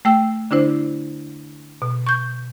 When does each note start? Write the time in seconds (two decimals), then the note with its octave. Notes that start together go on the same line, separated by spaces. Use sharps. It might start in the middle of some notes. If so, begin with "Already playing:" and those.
0.05 A3 G5 E6
0.51 D3 D4 E4 C5
1.82 B2
2.07 C#6 G6